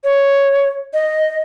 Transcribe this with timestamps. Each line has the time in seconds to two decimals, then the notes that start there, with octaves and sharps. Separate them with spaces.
0.04 C#5
0.94 D#5